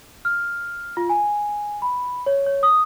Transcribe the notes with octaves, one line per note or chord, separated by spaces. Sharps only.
F6
F4
G#5
B5
C#5
C#5
D#6